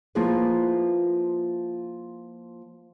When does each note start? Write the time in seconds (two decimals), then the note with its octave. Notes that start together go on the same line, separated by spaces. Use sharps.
0.15 F3 A#3 E4 F4 G#4 B4